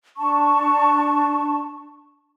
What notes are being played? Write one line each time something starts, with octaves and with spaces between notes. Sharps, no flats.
D4 A5 C#6